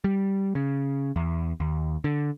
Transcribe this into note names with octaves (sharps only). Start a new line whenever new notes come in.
G3
C#3
E2
D#2
D3